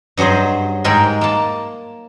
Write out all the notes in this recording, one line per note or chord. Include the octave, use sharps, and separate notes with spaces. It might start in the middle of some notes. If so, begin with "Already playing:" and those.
G2 F#3 G#4 C5 D#5
G#2 G#3 A#4 G5 G#5
A#3 A5